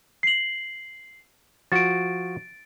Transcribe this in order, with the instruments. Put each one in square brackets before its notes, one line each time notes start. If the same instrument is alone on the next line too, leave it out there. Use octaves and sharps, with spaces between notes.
[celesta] C7 F#7
[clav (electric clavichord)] F3 F#4 [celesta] A6 D7